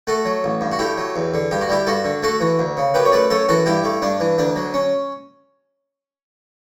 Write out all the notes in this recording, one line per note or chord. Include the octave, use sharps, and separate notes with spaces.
A3 F#4 A4
F#3
A1
G2
F#4
A3 E4 G4
F#3
E2
D3
G2 G4
F#4
G3 E4 G4
G2 F#4 A4
D3
A3 F#4 A4
E3
D2
C#3
F#2 G4 B4
C#5
A3 B4 D5
F#2 A4 C#5
E3 F#4 A4
G2 E4 G4
A3
G2 D4
E3
D2 D4
F#3
C#4